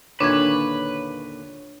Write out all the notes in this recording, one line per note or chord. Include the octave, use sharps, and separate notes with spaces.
D#2 A#2 D3 D4 B4 C#5 G#6